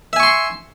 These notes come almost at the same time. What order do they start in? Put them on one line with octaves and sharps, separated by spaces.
E5 G#5 C#6 C6